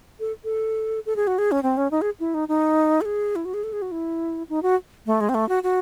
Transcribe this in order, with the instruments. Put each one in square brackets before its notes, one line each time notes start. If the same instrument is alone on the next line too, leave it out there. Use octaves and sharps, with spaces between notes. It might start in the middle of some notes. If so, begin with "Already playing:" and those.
[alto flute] A4
A4
A4
G#4
F#4
G#4
C#4
C4
C#4
D#4
G#4
E4
D#4
D#4
A4
G#4
E4
F#4
G#4
A4
G#4
F#4
E4
D#4
F#4
A3
G#3
C4
A3
F#4
F#4